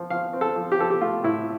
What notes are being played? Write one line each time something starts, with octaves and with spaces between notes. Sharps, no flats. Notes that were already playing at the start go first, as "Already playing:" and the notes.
Already playing: F3 C4
F3 F5
C4
A4
F3
G4
F3 A4
G4
A3 F4
A2 E4